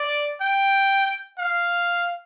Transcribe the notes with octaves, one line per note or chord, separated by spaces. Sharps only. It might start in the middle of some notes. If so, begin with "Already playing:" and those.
Already playing: D5
G5
F5